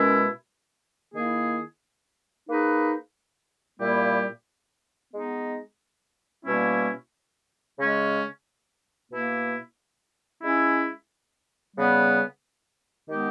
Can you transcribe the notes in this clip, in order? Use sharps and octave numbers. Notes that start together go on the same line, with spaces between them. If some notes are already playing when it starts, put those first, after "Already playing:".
Already playing: B2 G#3 C#4 E4 A#4
D#3 A#3 E4 G#4
A#3 D#4 G#4 B4
A#2 G3 A#3 E4 G4
G#3 B3 D#4
B2 G3 A#3 C#4 E4
C#3 G#3 C#4
B2 A#3 E4
G#3 C#4 E4
C#3 G3 B3
D#3 G#3 B3 D#4 G4